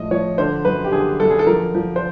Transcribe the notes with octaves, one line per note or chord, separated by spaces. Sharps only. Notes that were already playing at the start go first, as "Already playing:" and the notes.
Already playing: A2 F3 G#3 D#5
F3 C#5
D3 C5
F#2 B4
G4
D3 G#4
F#2 A4
G#4
A4
F3 A#4
F3
C5